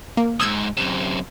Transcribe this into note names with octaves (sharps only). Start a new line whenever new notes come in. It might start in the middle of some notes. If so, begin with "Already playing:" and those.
A#3
C#2 G#2 D#6 E6 G#6
F#2 C3